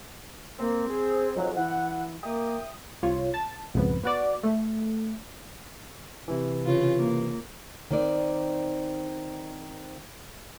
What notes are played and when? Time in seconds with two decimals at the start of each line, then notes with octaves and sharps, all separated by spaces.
0.59 A#3 C4
0.88 G#4
1.36 F2 G#2 F#3
1.57 E3 F#5
2.23 A#3 E5 G5 D#6
3.03 C2 F4 C#5
3.34 A5
3.74 B1 F2 G#2 C#3 B3
4.03 B3 F#4 D5
4.43 A3
6.28 C3 E3
6.65 C#3 F4
6.97 A#3
7.91 D#3 C4 D5